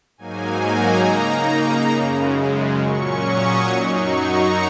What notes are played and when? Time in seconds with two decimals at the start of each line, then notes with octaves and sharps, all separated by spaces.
0.18 G#2 F#3 A#3 D#4 G#5
0.62 A#5
1.04 C#3 A#3 D#4
1.92 F#2 C#3 G#3
2.79 A#2 F#3 C#4 C#6
3.23 D#6
3.66 F#2 F#3 D#4 C#6
3.95 C#6
4.25 A#5